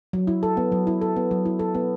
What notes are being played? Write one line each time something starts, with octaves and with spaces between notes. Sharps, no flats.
F#3
E4
A4
B3
F#3
E4
A4
B3
F#3
E4
A4
B3